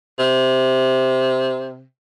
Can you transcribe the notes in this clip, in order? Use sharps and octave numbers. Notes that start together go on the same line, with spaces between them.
C3